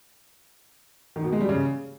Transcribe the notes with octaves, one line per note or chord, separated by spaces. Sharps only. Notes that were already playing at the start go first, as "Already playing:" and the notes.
D#3
B2
G#3
G3
C#3